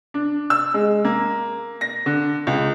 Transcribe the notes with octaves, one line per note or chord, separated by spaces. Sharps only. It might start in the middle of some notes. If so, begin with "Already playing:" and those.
D4
E6
G#3
A#3
A#6
D3
C#2